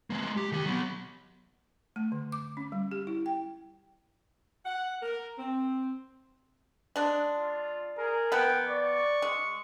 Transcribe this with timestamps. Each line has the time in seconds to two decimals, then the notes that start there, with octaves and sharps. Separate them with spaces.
0.10 G#3 A#3
0.37 G4
0.52 D#3 G4
0.66 F#3 B3
1.96 A3
2.12 D3
2.32 D6
2.57 C#4
2.72 G3
2.91 G4
3.07 E4
3.26 G5
4.65 F#5
5.02 A#4
5.38 C4
6.96 G#3 D4
7.37 F4
7.98 G#4 A#4
8.32 F3 B3 G5
8.68 D5 C#6
9.22 G#3